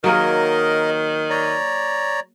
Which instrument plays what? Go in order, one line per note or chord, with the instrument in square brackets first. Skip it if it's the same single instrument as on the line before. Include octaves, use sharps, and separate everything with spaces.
[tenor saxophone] D#3 [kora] F#3 A#3 G#4 [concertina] A#4 D#5
[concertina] C#5 D5 A#5